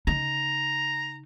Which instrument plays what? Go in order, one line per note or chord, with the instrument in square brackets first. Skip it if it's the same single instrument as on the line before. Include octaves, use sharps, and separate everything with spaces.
[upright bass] C#3 D#4 [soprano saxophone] A#5